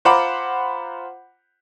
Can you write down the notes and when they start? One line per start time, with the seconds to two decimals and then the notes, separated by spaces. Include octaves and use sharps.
0.05 F4 C5 F#5 A#5 B5 D6